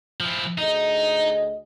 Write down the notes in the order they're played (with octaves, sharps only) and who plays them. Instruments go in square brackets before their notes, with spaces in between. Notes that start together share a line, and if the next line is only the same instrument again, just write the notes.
[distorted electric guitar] F3 E4
[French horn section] D2 G#4 D#5 [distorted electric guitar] D#4